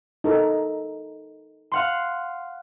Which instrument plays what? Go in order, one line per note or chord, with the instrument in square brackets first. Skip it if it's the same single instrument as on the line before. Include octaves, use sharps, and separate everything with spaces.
[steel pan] D#4 A4 A#4
[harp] F5 F#5 C6